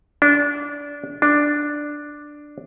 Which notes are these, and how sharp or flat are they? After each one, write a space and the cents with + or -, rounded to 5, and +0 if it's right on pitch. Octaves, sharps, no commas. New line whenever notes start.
D4 -20
D4 +5